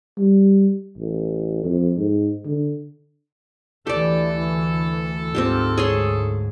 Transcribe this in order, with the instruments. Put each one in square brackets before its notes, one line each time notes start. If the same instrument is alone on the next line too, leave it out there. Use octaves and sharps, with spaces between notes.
[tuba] G3
A1
F2
G#2
D3
[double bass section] D2 E3 [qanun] G4 D5 [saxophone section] A4
[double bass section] D2 G#2 [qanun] C4 F4 G4
[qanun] G#4 C#5 C6